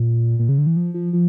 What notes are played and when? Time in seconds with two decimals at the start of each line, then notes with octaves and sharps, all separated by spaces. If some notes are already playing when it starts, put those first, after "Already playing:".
Already playing: A#2
0.39 A#2
0.49 C#3
0.58 D3
0.67 E3
0.76 F3
0.94 F3
1.13 F3